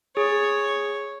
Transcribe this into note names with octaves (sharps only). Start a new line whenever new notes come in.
G#4 C#5